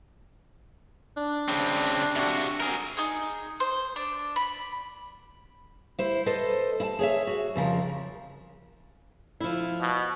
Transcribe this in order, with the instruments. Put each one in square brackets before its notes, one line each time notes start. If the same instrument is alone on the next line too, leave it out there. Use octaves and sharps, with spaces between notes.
[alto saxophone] D4
[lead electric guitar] C#3 C4
C3 F#4
G#4 A#4
[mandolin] D#4 G#4
C5
D4
B5
[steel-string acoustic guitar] E4 C5
A4 B4 C5 D#5
E4 A5
G#4 C#5 E5
F#4
F2 C#3 F3 A#4
[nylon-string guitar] F3 E4
[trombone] B2